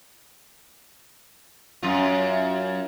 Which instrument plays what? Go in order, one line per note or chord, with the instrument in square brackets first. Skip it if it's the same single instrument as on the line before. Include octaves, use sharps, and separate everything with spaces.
[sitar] F#2 F4